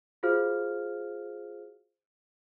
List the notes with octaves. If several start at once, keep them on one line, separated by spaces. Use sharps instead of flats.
F4 F#4 G#4 C5 F5 F6